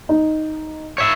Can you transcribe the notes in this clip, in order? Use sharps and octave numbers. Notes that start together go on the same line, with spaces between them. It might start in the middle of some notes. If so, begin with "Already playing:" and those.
D#4
C#5 E5